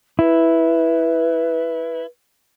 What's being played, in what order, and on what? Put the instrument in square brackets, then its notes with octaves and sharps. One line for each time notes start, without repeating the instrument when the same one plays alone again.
[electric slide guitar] E4 [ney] B4